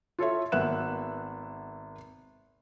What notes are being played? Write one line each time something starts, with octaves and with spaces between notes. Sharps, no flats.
F4 A4 C#5 E5
G#1 A#3 B3 E5 F#6 E7